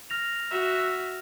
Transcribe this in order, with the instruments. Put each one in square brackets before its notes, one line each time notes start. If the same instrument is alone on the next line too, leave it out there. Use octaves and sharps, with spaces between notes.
[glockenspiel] F6 A#6 F7
[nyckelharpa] F#4 E5